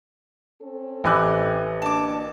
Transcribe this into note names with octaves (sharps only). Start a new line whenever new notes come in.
C4 C#4 A4
A1 E3 G4 G#5 F#6
D2 A#3 D4 A5 D6